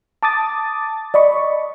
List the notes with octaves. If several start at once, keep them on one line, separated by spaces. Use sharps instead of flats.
A5 D6 D#6 A6
D5 D#5 B5 C#6